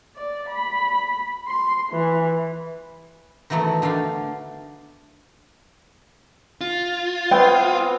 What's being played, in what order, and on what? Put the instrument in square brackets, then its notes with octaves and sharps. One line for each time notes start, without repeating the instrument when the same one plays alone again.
[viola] D5
B5
C6
E3
[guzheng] D#3 E3 F#3 A3 B3
D3 A3 D4 F5 G5
[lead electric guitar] F4
[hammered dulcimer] B3 C4 G#4 [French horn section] B4 [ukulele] G5